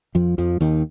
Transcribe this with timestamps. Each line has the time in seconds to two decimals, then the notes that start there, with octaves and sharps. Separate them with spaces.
0.15 F2 F3
0.38 F2 F3
0.60 D#2 D#3